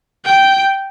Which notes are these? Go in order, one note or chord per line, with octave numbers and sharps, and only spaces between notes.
G5